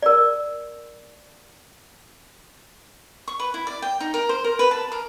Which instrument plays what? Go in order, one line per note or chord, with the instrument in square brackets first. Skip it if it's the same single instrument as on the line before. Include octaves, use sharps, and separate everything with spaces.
[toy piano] A#4 D5
[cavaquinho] C#6
B4
E4
D5
G5
D#4
A#4
C5
A#4
B4
A5
A#4